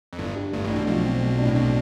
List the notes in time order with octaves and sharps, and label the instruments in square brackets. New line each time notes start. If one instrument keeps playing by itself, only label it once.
[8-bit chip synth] F2
[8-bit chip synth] G1 G2 [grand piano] D4
[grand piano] G4
[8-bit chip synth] G1 G2 [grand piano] A3
[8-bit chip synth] A1 A2 [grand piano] D4
[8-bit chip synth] B1 B2
[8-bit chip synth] B1 B2 [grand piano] F3
[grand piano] C4
A3
D4
[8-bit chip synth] A2
[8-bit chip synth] B1 B2 [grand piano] C4